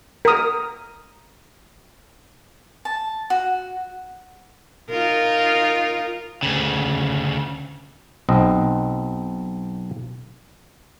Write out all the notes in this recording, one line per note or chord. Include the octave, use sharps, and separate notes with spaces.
A#4 D#6
A5
F#4
D#4 F4 A#4
D2 C#3
B1 C4 D#5